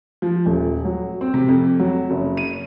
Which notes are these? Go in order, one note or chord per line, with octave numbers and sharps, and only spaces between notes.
F3
D#1
F#3
C4
C3
F2
F#3
F#1
D#7